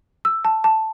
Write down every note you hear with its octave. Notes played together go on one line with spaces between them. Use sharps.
E6
A5
A5